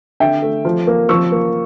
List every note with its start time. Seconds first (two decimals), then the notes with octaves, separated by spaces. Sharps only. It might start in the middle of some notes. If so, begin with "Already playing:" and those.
0.20 D3 E5 G5
0.42 A3
0.65 F3
0.87 A#3
1.09 F3 C#6 E6
1.32 A#3